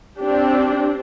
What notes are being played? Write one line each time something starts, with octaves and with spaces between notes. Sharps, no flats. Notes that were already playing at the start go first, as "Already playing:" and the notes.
C4 D4 G4